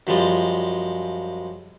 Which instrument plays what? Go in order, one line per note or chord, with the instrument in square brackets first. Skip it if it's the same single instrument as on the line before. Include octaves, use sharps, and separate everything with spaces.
[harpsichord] F#2 F3 G3 G#3